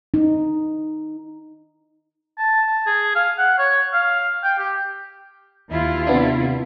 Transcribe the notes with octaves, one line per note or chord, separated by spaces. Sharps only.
D#4
A5
A5
G#4
F5
F#5
C#5
F5
G5
G4
D#2 E4 F4
C3 B3 D4